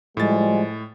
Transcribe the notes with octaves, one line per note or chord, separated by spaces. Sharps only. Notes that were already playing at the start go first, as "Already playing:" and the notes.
A2 F3 G3 G#3 A6